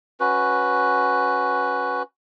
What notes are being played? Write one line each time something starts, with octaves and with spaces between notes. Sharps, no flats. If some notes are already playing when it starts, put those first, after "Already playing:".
C#4 F#4 B4